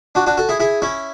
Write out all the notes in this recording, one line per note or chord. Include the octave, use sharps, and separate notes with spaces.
D4 F#4
D4 F#4
F#4 A4
E4 G#4
E4 G#4
C#4 E4